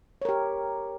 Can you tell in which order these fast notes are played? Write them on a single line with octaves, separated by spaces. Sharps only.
C#5 A#4 G4